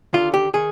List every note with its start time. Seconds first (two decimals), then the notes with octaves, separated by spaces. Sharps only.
0.13 D#2 D3 F4
0.34 G4
0.54 D#3 G#4